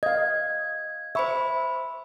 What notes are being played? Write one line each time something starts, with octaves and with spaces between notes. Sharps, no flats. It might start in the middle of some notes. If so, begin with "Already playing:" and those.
D#5 F5 G#6
C5 E5 B5 C#6 E6